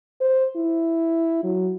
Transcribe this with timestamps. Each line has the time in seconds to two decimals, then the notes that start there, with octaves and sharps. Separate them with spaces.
0.21 C5
0.56 E4
1.44 F#3